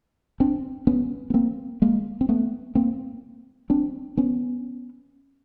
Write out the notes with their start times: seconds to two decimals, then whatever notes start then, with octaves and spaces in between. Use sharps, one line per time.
0.40 C4 D4
0.87 B3 C#4
1.30 B3
1.34 A#3 C4
1.82 G#3 A#3
2.21 C4
2.29 A3 B3
2.75 A#3 C4
3.70 C4 D4
4.17 B3 C#4